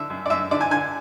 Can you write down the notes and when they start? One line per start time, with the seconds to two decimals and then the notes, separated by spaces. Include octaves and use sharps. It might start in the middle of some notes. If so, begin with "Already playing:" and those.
Already playing: D3 E5
0.10 F#2
0.26 D5
0.30 F#2 E5
0.51 D3 D5
0.61 G#5
0.71 D3 G#5